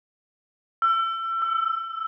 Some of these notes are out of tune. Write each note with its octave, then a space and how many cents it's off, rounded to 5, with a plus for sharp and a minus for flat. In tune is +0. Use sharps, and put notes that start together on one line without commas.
E6 +30
E6 -5